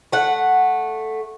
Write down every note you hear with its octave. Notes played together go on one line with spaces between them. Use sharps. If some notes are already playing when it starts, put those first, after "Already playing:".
A3 F#5